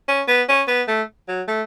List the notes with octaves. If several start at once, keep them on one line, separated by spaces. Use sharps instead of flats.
C#4
B3
C#4
B3
A3
F#3
A3